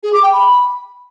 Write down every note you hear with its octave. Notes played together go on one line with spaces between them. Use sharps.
G#4
D6
G5
B5